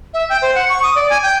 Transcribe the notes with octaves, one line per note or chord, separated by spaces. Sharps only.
E5
G5
C5
F#5
C#6
D#6
D5
G#5
G5